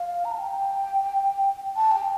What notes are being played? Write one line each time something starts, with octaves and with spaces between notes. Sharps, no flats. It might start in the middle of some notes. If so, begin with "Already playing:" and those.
Already playing: F5
A#5
A5
G5
A5
G5